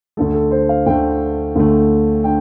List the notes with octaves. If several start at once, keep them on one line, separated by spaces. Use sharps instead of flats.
D2 D3 A3 A4
A4
C5
F5
D2 D3 A3 G5
D2 D3 A3
D3 G5